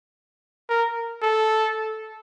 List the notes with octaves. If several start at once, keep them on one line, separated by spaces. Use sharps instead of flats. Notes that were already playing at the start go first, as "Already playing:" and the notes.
A#4
A4